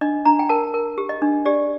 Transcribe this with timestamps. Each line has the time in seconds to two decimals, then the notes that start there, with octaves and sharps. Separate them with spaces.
0.01 D4 D#5
0.25 D4 A#5
0.39 G5
0.49 A#4 A5
0.74 A#4
0.98 G4
1.09 D#5
1.22 D4
1.46 G4 D5